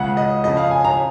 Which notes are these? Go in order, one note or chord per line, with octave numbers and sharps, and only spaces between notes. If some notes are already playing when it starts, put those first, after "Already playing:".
Already playing: C#2 C#3 F#5
D#5
F2 C#3 D#5
F5
G#5
A#5